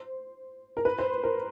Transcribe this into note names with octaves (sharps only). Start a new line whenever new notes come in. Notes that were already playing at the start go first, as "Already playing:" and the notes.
Already playing: C5
A#4
B4
C5
A#4